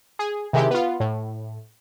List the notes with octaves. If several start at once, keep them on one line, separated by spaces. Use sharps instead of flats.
G#4
C3 D#3 G#3 E4 G4
B3 F4
A2